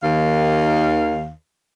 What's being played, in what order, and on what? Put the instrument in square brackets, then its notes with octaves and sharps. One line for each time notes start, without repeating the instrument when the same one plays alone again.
[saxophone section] D#2 D#3 F5